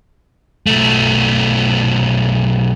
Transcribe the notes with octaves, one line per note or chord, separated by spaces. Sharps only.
B1 A3